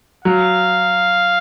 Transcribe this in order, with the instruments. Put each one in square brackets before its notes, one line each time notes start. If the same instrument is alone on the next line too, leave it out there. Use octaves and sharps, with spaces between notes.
[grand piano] F#3 [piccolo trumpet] F5